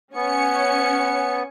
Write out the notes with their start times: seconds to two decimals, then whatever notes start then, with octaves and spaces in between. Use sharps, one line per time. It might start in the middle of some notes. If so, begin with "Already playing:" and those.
0.14 B3 C#4 G#5 C#7